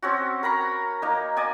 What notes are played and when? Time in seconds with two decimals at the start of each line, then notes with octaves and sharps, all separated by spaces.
0.02 C4 C#4 F#4
0.43 A#4 A#5 B5 C#6
1.02 A#3 D#4
1.37 D5 D#5 G#5